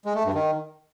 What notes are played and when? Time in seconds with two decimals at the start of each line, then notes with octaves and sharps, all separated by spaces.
0.05 G#3
0.15 A3
0.24 G2
0.34 D#3